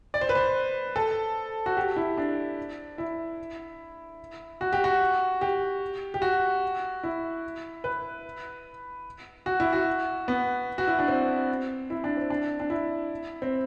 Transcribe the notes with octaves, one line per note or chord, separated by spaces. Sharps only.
D5
C5
B4
C5
A4
F#4
G4
E4
D4
E4
F#4
G4
F#4
G4
G4
F#4
E4
B4
F#4
E4
F#4
B3
F#4
E4
D4
C4
E4
D4
C4
D4
D4
E4
C4